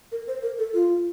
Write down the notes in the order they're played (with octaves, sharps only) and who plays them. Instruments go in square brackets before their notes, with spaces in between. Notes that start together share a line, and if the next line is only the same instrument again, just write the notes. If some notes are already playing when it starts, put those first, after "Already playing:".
[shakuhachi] A#4
C5
A#4
A4
F4